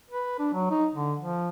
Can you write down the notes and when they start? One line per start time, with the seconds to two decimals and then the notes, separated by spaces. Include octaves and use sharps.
0.10 B4
0.39 D4
0.54 F#3
0.70 D#4
0.94 D3
1.19 F3